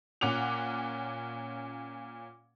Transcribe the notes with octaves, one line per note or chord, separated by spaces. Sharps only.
A#2 C#4 F#5 D6 F7